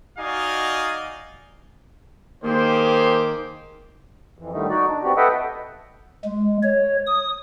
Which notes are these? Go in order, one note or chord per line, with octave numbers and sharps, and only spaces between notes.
D#4 F#4 D5 D#5 F5 G#5
D#3 A#3 G4 G#4 C5
F2 E3
A2 D3 D#3 G3 A3 D#4
D#4 F#4 D5
D4
B3 C4 F#4 G4 D5
A4 B4 D#5 E5 F#5 G5
G#3
C#5
D#6